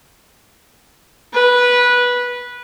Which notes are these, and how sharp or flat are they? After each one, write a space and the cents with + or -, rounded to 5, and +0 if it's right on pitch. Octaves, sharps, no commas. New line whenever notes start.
B4 -15